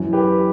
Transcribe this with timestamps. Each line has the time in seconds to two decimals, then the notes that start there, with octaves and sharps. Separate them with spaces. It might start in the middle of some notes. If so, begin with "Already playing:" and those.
Already playing: F#2 E3
0.13 G4 B4